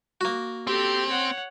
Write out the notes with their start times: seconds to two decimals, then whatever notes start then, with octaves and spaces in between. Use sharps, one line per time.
0.21 A#3 F#4
0.67 C4 G4 A4
1.10 C#5 F#5